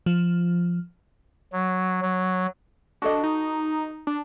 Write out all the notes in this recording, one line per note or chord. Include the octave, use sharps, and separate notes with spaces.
F3
F#3
F#3
D4 F#4 A4 D#5
D#4
D4